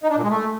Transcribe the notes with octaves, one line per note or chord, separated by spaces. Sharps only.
D#4
D4
A#2
G#3
A3